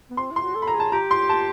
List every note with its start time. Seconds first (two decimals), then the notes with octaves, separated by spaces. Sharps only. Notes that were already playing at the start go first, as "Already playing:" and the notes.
0.10 B3
0.17 C4 C6
0.31 E4
0.36 C6
0.42 F#4
0.55 A4
0.62 B5
0.67 A#5
0.74 G#4
0.80 A5
0.92 G4 A#5
1.11 C6
1.29 A5